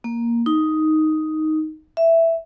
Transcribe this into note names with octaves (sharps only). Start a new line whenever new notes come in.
A#3
D#4
E5